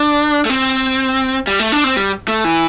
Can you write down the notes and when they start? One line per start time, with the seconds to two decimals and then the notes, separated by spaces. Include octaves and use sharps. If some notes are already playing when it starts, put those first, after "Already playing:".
Already playing: D4
0.45 A3
0.50 C4
1.47 G3
1.59 A3
1.72 D4
1.84 C4
1.96 G3
2.28 A3
2.44 E3